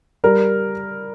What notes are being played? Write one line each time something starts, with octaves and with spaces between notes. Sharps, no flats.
G3 A#4